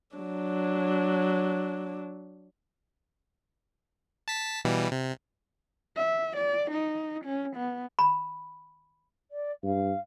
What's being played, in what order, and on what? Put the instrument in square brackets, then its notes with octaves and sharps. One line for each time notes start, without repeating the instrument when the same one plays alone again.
[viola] F#3 D4
[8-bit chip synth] A5 B6
B2 E3 G3
C3
[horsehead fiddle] E5
D5
D#4
C#4
B3
[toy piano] B5
[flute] D5
[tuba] G2 [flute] F5